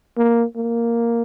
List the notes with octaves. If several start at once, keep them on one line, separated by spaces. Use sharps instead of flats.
A#3
A#3